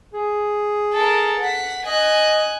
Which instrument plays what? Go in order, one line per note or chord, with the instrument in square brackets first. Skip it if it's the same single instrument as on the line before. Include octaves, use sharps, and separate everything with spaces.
[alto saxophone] G#4
[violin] A4 A#4
F#5 B6
[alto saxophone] D#5 [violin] G#5 F#6